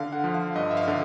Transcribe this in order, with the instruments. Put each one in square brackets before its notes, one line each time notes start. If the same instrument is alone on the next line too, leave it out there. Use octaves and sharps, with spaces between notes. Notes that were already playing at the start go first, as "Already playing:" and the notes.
Already playing: [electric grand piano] D3 F5
F#5
F3
F5
G2 D#5
E5
F5
D3